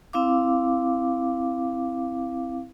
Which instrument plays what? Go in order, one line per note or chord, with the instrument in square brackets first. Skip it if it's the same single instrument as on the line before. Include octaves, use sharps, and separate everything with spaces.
[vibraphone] C4 E4 F5 D6